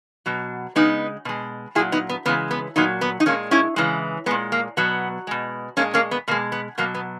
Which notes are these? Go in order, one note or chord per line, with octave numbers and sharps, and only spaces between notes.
B2 F#3
C#3 G#3 B3 D#4
B2 G#3
A#2 F#3 E4 G#4
B3 D#4
B3
C#3 E3 G#3 B3
B3
A#2 F#3 B3 D#4
B3
D#4
A#2 G#3 A#3 C#4
C#4 E4
C#3 E3 G#3
A#2 G#3 B3
A#3
B2 F#3 B3
B2 G#3
A#2 G#3 A#3 C#4
A#3 C#4
B3
B2 G#3 A#3
B3
B2 F#3 A#3
B3